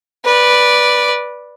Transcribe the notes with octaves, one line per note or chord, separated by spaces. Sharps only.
B4 D5